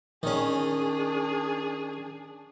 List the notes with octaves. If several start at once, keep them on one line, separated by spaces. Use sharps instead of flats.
D#3 C#4 D4 G#4